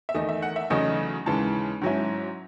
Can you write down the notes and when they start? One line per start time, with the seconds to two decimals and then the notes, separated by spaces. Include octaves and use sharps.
0.09 E5
0.15 E2 D#3 A3 D#5
0.29 E5
0.42 F#5
0.56 E5
0.70 E2 C#3 F#3 A3 D#4 D#5
1.26 D#2 C#3 E3 G#3 A5
1.81 G#2 F#3 C#4 E4